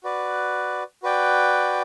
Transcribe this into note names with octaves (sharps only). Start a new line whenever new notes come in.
F#4 B4 D5
F#4 B4 D5 G5